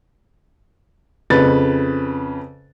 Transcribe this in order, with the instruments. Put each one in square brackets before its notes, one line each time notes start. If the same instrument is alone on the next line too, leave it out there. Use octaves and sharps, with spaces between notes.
[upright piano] F2 C#3 B4 A6